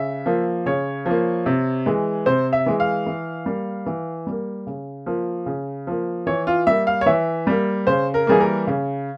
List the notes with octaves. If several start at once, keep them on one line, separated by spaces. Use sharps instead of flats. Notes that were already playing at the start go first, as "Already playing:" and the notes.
Already playing: C#3 E5
F3 A#3
C#3 C#5
F3 A#3
C3
E3 G#3
C3 C5
E5
E3 G#3
F5
E3
G3 A#3
E3
G3 A#3
C#3
F3 A#3
C#3
F3 A#3
E3 C#5
F4
G3 A#3 E5
F5
C#5
E3 E5
G3 A#3
C#3 C5
A#4
E3 G3 A#3 G#4
A#4
C#3